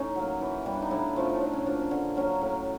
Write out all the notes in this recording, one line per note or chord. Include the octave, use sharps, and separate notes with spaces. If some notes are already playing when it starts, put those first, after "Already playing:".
Already playing: A2 C#4 D#4
F#3 A#3
E3
G3 B3
D4
D#4
A2 D4 E4
F3 A3 C#4
D#4
A2 D4
C#4
F3 A#3 D4
C#4
D3 C#4
F#3 A#3 C#4
A2